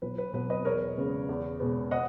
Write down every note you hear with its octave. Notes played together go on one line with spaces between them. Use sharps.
B1 B4
B4
B2 F#3 B3 B4
B4 D#5
E2 A#4 C#5
C#3 G#3 B3
E2
B2 G#3 B3
D#5 F#5